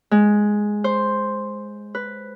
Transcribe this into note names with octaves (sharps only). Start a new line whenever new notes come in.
G#3
C5
B4